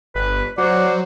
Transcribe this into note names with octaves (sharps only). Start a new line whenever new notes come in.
G1 B4
F#3 C5 D5 F#5